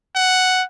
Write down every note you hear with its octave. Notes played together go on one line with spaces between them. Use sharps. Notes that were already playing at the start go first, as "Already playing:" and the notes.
F#5